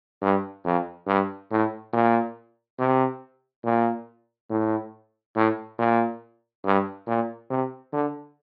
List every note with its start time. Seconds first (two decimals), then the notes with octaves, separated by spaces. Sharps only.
0.22 G2
0.65 F2
1.07 G2
1.51 A2
1.93 A#2
2.79 C3
3.64 A#2
4.50 A2
5.36 A2
5.79 A#2
6.65 G2
7.07 A#2
7.50 C3
7.93 D3